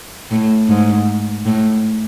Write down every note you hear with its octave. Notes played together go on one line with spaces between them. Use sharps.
A2
G#2
A2